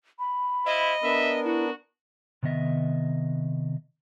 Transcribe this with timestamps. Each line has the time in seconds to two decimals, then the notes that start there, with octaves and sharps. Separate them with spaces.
0.19 B5
0.66 E4 C5 D#5 F5
1.03 B3 D4 A#4 E5
1.44 E4 F#4
2.43 C3 D#3 B3 D#5 E5